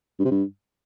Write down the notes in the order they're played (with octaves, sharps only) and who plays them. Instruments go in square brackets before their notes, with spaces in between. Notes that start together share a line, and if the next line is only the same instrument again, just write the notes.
[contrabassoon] G2
C3
G2